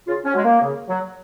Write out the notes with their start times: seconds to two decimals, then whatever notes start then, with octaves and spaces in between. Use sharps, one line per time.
0.07 C#3 F4
0.25 C#4
0.34 F#3 G#3
0.44 A#3
0.61 C#3
0.89 F#3